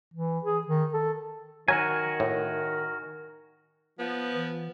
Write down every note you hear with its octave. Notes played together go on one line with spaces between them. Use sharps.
E3
G#4
D#3
A4
D#3 F#3 F#4 A#4 G#5
A2
F3 B3
E3